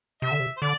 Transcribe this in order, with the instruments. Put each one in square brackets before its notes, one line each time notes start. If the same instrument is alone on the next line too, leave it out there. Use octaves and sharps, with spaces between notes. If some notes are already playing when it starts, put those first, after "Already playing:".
[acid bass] C3 [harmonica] E5
[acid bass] D3
C3
[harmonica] C5
[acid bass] D3 [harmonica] D5